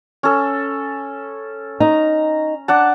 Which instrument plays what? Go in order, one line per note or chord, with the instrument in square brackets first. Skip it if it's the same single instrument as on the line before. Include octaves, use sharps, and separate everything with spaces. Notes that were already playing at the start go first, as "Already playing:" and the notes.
[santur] C#4 A4
[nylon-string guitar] D#4 [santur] A#5
[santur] D4 F#5 A5